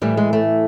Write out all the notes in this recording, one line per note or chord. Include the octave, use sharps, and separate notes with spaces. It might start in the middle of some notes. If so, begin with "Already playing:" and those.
A2 E3 G3
G#3
A3